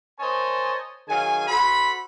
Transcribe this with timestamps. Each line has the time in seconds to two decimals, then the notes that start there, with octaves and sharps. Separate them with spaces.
0.19 A#4 C5 C#5 D#5 G#5 A5
1.08 D#3 F#3 G#4 F5 G#5
1.48 F#4 A4 C5 B5